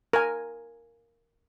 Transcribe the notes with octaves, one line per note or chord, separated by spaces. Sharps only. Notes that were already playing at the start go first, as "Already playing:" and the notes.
A#4 G#5